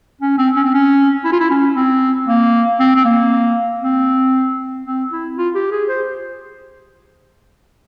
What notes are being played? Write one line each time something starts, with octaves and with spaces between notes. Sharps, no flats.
C#4
C4
C#4
C4
C#4
E4
F4
E4
C#4
C4
A#3
C4
C4
A#3
C4
C4
E4
F4
G4
G#4
C5